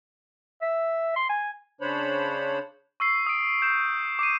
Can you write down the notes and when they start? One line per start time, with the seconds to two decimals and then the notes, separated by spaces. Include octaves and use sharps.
0.62 E5
1.16 C6
1.29 G#5
1.81 C#3 D4 C5 C#5 B5
3.00 C#6 E6 C7
3.26 D#6 D7
3.62 G6 E7
4.19 D6 C7 D#7